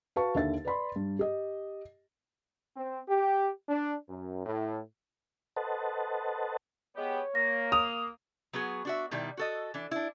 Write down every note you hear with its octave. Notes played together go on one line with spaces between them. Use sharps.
F#4 B4 F5 A5 C#6
D#2 D3 E5 A6
B4 D5 B5 C6
G2
G4 D#5
C4
G4
D4
F#2
A2
A4 B4 C5 D#5 F#5 A5
G#3 B3 G4 C#5
A#3 A#6
D#6 F7
F#3 B3 F#4 G#4
D4 F#4 E5
B2 D#3 G3 E4
F#4 A4 D#5
E3 D4
D4 E4